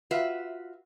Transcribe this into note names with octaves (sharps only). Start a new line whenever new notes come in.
F4 F#4 B4 E5